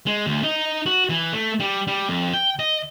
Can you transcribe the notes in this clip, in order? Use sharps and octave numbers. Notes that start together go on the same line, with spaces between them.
G#3
D2
D#4
F#4
E3
A3
G3
G3
F2
G5
D#5